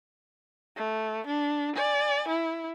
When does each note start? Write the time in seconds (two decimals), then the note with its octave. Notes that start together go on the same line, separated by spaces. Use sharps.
0.76 A3
1.27 D4
1.76 D5 G#5
2.29 E4